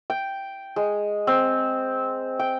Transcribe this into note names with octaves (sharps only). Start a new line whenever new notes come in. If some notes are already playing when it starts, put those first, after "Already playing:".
G5
G#3
C4
G5